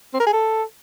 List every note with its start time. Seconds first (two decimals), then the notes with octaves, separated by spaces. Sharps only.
0.14 C4
0.20 A#4
0.27 G#4
0.33 A4